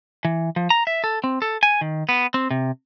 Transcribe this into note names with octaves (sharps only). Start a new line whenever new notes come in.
E3
F3
A#5
E5
A4
C4
A4
G#5
D#3
B3
C4
C3